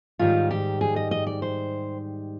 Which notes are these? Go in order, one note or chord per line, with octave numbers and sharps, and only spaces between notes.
G#2 D#3 G3 F4
G4
G#4
D#5
D#5
D5
C5